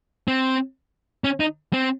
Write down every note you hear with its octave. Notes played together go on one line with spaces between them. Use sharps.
C4
C#4
D#4
C4